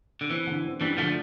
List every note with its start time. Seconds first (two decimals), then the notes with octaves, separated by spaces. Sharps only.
0.21 D3
0.30 E3 C4
0.47 D3
0.64 C4
0.81 E3 G3 D4
0.97 D3 F3 A3